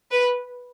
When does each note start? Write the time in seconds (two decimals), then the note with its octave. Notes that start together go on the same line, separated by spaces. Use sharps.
0.11 B4